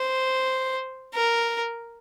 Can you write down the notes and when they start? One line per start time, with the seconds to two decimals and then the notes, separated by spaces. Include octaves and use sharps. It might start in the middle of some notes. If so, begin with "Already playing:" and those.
Already playing: C5
1.15 A#4